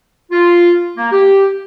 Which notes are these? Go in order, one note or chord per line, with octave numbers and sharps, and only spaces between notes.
F4
A#3
G4